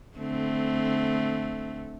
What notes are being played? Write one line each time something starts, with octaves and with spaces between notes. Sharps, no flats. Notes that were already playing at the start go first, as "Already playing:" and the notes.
D3 A3 C4